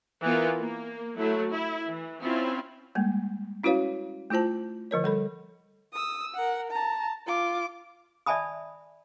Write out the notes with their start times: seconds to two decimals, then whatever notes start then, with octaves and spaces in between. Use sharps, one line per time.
0.24 E3 B3 F4 A#4
0.59 A#3
1.15 F#3 A3 E4
1.52 E4
1.87 E3
2.21 C4 C#4 E4 F4
2.95 G3 G#3 A#3
3.64 C#4 E4 F#4 B4 C#5 F5
4.30 A3 E4 F4 C5 A5
4.91 D3 F3 A#4 C#5
5.04 G3 A4 B5
5.93 D#6 E6
6.35 A#4 F#5
6.71 A5 A#5
7.26 F4 D6
8.26 D5 E5 G#5 A5 B5 D#6